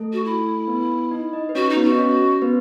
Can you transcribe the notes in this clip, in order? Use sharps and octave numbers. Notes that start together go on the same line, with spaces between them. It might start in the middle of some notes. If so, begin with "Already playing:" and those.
Already playing: A3 A4
F#4
E4
B3 B4
D#4 D#5
D#4 D#5
B4
C#4 F#4 C#5
D#4
B3 B4
F#4
D#5
C#4 C#5
B3 B4